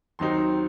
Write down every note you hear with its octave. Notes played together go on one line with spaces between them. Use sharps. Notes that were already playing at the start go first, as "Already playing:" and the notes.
D#2 D#3 F#3 C4 D#4 C6